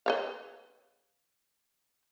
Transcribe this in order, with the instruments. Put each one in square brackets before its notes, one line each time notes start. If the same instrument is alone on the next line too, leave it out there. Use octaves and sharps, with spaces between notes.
[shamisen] B4 C#5 F5